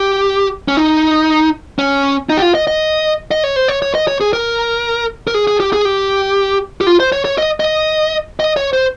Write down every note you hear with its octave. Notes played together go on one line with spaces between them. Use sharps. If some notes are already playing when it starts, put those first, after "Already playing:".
Already playing: G4
C#4
D#4
C#4
D#4
G4
F4
D#5
D#5
D#5
C#5
C5
C#5
C#5
D#5
C#5
G#4
A#4
A#4
G#4
G#4
G4
G#4
G4
G4
F4
C5
C#5
C#5
D#5
D#5
D#5
C#5
C5